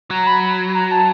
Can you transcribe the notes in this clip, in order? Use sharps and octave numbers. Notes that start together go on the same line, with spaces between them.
F#3 A#5
B5
B5
A#5
A5